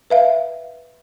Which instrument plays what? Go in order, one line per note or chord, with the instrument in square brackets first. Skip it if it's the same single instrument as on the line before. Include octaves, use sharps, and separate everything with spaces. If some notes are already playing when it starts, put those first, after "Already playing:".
[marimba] B4 E5 F5